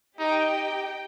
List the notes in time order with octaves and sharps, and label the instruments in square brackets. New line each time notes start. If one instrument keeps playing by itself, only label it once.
[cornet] D#4 [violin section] G4 D#5 G5